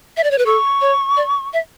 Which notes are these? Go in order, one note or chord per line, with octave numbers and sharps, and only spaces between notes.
E5
D5
C#5
B4
A4 C#6
C#5
D5
E5